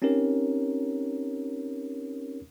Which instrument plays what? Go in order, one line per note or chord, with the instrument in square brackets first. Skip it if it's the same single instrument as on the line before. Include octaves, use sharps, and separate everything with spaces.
[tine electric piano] C4 C#4 D#4 G4 A#4 C#5